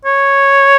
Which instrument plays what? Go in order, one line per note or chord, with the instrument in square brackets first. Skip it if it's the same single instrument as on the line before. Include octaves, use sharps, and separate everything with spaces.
[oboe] C#5